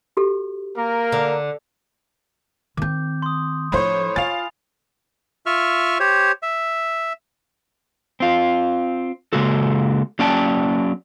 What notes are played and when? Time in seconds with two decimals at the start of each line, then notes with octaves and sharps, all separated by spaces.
0.17 F#4 G4 A4
0.78 A#3 A#4
1.12 D3
2.77 D#3 C4 D6 G6
3.22 C6 D#6
3.72 A2 F3 D4 C5 C#5 B5
4.16 F4 F5 G#5 A6 F7
5.46 F4 E5 C#6 F6
6.00 G4 C5 C#5
6.43 E5
8.20 C4 F4
9.33 C#3 G#3 A#3 F#4 A4
10.19 F#3 A#3 C#4 D5 G5 A5